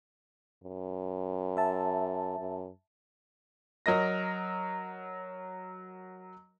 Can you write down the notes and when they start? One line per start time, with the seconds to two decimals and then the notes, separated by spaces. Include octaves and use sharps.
0.64 F#2
1.57 E5 A5
2.39 F#2
3.86 F#3 A#4 D#5 A#6